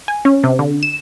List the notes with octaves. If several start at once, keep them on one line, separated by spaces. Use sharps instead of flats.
G#5
C#4
C3
D3
E7